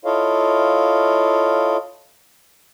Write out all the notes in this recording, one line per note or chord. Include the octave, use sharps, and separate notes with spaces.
E4 F4 A4 C#5 D#5 F5